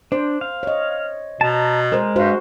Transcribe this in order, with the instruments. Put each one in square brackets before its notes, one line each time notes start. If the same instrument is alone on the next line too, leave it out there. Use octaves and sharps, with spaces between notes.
[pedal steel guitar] D4 [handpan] C5
[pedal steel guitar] F5
[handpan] C#5 D#5
[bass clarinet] B2 [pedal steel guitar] A5 A#5
[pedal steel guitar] G#3 [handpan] A#4 C5
[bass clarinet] G2 [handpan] F#4 C5